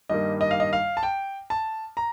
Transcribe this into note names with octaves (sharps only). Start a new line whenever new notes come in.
G2 D#3 G3 A#3 D#5
D#5
F5
D#5
F5
A5
G5
A5
A#5